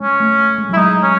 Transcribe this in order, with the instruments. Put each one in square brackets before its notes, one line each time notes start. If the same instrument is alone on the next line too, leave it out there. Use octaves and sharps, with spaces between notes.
[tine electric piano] G#3 [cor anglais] C#4
[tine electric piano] A3
A3
G#3
F#3
[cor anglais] E4
[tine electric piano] G#3 [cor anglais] D#4
[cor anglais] C#4